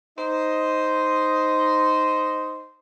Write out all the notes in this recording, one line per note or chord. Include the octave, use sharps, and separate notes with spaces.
D#4 C5 D#5